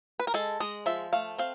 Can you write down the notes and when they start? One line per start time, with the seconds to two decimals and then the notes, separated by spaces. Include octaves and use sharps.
0.19 B4
0.27 A#4
0.34 G#3 A4
0.60 G#3 D#5
0.86 F3 E5
1.13 A3 F5
1.38 C4 F5